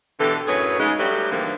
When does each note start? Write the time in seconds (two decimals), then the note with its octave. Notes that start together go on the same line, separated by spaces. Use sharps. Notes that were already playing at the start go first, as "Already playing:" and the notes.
0.19 B2 D3 E3 G4 A4
0.47 F#2 A2 F#3 G#4 B4 C#5
0.79 C#3 G#3 D#4
0.99 F#3 G3 A3 B3 D4 G4
1.31 G#2 D3 E3 F3 G3 A#3